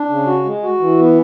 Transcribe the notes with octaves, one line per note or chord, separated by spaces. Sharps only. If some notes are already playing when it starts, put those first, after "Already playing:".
Already playing: D4
C#3
F#4
G#3
F#4
E3
B3